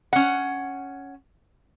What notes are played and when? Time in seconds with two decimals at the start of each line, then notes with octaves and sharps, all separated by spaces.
0.13 C#4 F#5